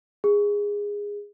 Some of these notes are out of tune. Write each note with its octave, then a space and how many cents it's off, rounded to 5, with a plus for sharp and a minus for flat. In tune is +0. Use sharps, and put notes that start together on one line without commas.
G#4 -15